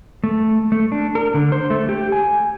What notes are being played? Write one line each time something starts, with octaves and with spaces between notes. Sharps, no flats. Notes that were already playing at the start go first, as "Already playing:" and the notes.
A3
A3
D4
A#4
D3
C5
A3
G4
G#5